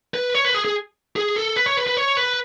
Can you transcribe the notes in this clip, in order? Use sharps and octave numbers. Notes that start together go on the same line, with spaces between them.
B4
C#5
B4
G#4
G#4
G#4
A4
B4
C#5
B4
B4
C#5
B4